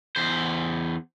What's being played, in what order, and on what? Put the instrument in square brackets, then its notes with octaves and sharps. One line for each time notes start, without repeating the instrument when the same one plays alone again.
[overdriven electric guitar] E2 C5